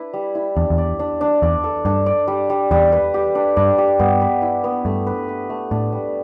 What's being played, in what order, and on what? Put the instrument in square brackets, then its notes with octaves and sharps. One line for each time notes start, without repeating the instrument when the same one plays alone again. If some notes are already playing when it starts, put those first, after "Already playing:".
Already playing: [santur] D4 E4 B4
G3
E4
[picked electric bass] E2 [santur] D4
[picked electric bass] E2
[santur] D5
D4
D4
[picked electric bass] E2 [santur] D5
[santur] A4
[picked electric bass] G2 [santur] D4
[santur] D5
G3
G3
[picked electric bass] E2 [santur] G3
[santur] B4
G4
D4
[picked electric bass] G2 [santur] D4
[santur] G4
[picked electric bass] G2 [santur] B3
[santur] B4
E4
B3
[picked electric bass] G2 [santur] A3
[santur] B4
B4
A3
[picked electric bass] A2 [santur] D4
[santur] G3